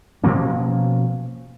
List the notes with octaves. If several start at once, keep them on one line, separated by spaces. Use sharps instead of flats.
B2 F3 A#3 C#4